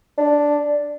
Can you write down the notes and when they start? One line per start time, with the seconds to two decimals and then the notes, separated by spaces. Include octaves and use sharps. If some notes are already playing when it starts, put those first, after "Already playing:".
0.18 D4